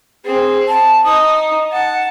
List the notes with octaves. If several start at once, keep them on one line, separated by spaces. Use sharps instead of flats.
C4 G#4
A5
D#4 D#6
F#5 A5